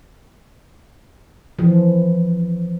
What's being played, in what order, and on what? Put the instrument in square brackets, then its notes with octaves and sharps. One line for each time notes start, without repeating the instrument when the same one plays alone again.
[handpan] E3 F3